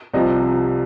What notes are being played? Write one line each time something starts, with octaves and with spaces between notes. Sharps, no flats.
C2 C3 F3 D#5